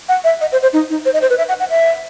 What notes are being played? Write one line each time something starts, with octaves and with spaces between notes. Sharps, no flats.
F#5
E5
D#5
C5
C5
D#4
D#4
C5
D#5
C5
B4
E5
F#5
F#5
E5